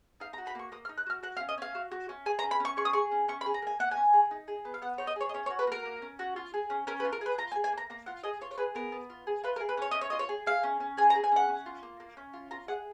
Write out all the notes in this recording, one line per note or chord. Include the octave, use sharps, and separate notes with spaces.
D#4 F5
A#5
F#4
B5
A#3 C#6
A#3 D#6
F6
D#4
F#6
F#4 F6
F#4 F#5
F5
C#4
D#5
C#4 F5
F#4
F#4
C#4
G#4 G#5
A#5
C#4
B5
C#4 C#6
G#4 C#6
D#6
G#4 C#6
C#4
C#4 C#6
B5
G#4
A#5
A#3 G#5
A#3 F#5
G#5
C#4
G#4
D#4
G#4
B3
F5
B3 F#5
D#4 C#5
D#5
G#4 C#5
D#5
C#4 C#5
C#5
F#4
B4
A#3 A#4
A#3
C#4
F#4
F4
G#4
C#4
C#4 A#4
B4
F4
A#4
G#4 B4
F4 A#5
G#5
G#4
G#5
A#3
A#5
A#3 A#5
F4 F#5
G#4 D#5
F4 C#5
C#5
G#4 B4
B3 A#4
B3
F4
G#4
F4 B4
A#4
G#4
B4
C#4 C#5
C#4 D#5
C#5
F4 D#5
C#5
G#4
G#4 F5
C#4
C#4
G#4 G#5
A#5
G#4
G#5
C#4 F#5
C#4
F4
A#3
A#3
C#4
F4
F4 A#5
G#4 F#5